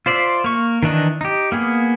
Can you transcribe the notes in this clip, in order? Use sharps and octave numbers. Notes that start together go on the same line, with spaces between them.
F4 C5 D5 E5
A#3 C#6
D#3 E3 D4 D#4
D#4 G4
A#3 B3 G#4